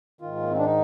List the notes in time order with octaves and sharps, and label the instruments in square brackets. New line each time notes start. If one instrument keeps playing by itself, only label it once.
[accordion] G#2 D#3 F4
A#3
C4
D4
D#4